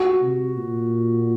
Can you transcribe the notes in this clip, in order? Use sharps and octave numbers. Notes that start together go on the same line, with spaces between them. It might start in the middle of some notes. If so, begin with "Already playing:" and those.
Already playing: F#4
C3
A#2